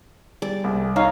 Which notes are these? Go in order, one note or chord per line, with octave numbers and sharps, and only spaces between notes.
G3 G#4 D5
C2
D#4 C#5 F5